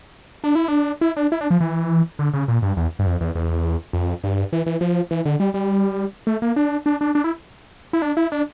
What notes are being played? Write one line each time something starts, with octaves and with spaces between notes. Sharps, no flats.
D4
E4
D4
E4
D4
E4
D4
F3
E3
D3
C#3
A#2
G2
E2
G2
F2
E2
E2
F2
G2
E3
E3
F3
E3
D3
G3
G3
A3
A#3
D4
D4
D4
D4
E4
E4
D4
E4
D4